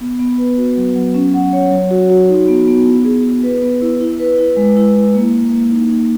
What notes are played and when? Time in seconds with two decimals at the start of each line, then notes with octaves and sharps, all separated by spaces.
0.01 B3
0.19 B3
0.38 B4
0.58 F#4
0.77 F#3
0.96 F#3
1.15 C#4
1.34 F#5
1.53 C#5
1.71 F#3
1.91 F#4
2.10 F#4
2.29 D#4
2.49 B3
2.68 B3
2.86 E4
3.05 G#4
3.24 G#4
3.43 B4
3.62 B3
3.82 E4
4.01 E4
4.20 B4
4.38 E4
4.57 G#3
4.77 E4
4.96 E4
5.14 A#3
5.34 E4
5.52 A#3
5.71 D#4
5.91 D#4